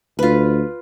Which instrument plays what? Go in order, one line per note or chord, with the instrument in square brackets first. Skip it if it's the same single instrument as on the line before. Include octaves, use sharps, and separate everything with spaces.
[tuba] D2 [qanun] F4 B4